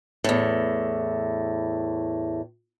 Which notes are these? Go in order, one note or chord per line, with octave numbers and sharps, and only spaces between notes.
E2 A2